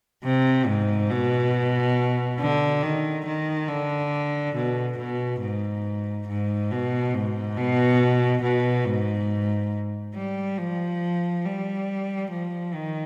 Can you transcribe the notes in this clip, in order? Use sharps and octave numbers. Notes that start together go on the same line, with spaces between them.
C3
G#2
B2
D3
D#3
D#3
D3
B2
B2
G#2
G#2
B2
G#2
B2
B2
G#2
G3
F3
G3
F3
D#3